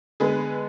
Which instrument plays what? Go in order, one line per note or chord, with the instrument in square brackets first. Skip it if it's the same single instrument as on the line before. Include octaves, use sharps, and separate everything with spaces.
[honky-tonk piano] D3 G#3 B3 G#4 B4